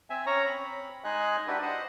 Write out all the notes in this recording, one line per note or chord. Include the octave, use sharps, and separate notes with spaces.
C4 E5 G#5
C#4 C#5 A#5
C4 B5
G#3 D#4 G#4 D#5 G#5 F#6
D4 E4 F#4 G4 B4
C5 D#5 F#5